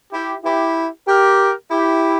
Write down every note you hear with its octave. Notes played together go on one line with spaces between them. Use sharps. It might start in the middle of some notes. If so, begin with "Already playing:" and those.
E4 G4
E4 G4
G4 A#4
E4 G4